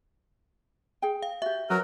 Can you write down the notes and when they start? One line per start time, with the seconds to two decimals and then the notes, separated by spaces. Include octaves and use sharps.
1.02 G#4 G5
1.23 F5
1.42 F#4 G4 E5
1.70 F#3 A#4 B4